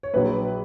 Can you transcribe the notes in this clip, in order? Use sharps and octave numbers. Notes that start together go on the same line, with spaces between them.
C#5
A#1 A#2 F#3 B4